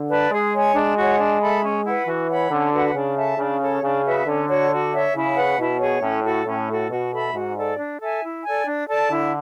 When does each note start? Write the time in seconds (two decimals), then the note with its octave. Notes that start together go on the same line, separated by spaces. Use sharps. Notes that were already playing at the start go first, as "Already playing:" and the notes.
Already playing: D3
0.09 B4 D5 A5
0.31 G#3 G#4
0.53 C#5 G#5
0.74 G#3 D4
0.96 F#4 C#5 F#5
1.19 D4
1.41 A4 E5 B5
1.63 C#4
1.84 E4 B4 F#5
2.07 E3 F#4
2.29 C#5 F#5 B5
2.50 D3 C#4
2.72 F#4 B4 F#5
2.94 C#3 D4
3.16 A4 E5 A5
3.38 C#3 D4
3.60 A4 C#5
3.82 C#3 D4
4.04 F#4 B4 E5
4.26 D3 C#4
4.48 F#4 C#5
4.70 F#4
4.92 C#5 E5
5.14 C#3 E4
5.36 B4 F#5
5.58 B2 E4
5.80 G#4 C#5
6.02 A2 C#4
6.24 F#4 A4
6.46 A2 C#4
6.68 F#4 A4
6.90 B2 F#4
7.12 A4 E5 B5
7.34 G#2 F#4
7.55 A4 D5
7.78 D4
7.99 A4 E5 G#5
8.22 E4
8.43 A4 D5 G#5
8.66 D4
8.88 A4 D5 A5
9.10 D3 E4